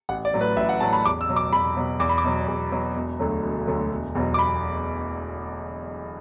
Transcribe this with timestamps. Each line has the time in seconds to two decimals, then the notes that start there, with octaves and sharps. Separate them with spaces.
0.09 A1 F#5
0.25 D5
0.34 A2 F#3
0.41 B4
0.57 A1 E5
0.69 F#5
0.80 A2 F#3 A5
0.93 B5
1.05 E2 D6
1.21 E6
1.29 B2 F#3
1.36 D6
1.52 E2 B5
1.77 B2 F#3
2.00 E2 D6
2.09 B5
2.18 D6
2.24 B2 F#3
2.48 E2
2.72 B2 F#3
2.96 E1
3.19 D2 D3 F#3
3.43 E1
3.67 D2 D3 F#3
3.91 E1
4.15 E2 B2 F#3
4.34 D6
4.39 B5